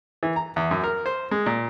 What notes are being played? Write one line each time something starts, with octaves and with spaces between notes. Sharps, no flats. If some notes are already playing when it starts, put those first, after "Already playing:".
E3
A#5
E2
F#2
A#4
C5
G#3
A#2